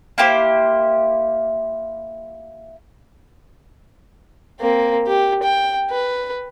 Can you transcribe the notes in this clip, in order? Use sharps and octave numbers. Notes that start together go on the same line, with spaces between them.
A#3 E4 G4 C5
A#3 C4
G4
G5
B4